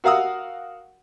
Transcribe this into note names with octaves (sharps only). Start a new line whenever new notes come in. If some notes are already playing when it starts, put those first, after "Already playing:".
F#4 A#4 F5 F#5 D#6 E6